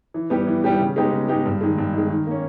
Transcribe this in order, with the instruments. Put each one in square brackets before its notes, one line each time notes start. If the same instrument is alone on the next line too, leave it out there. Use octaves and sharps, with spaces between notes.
[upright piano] E3
G3 B3 G4
E3
G3 B3 G4
C#3
G#3 B3 D#4 G4
C#3
G#3 B3 D#4 G4
G2
D#3 G#3
G2
D#3 G#3
D#3
A#3 C#4